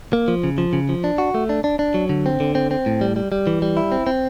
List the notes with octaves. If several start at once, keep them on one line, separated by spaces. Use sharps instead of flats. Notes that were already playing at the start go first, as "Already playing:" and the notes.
A#3
F3
C#3
F3
C#3
F3
D4
F#4
A3
D4
D4
D4
F#3
D3
C4
D3
C4
C4
A2
G3
G3
G3
E3
G3
E4
C4
C4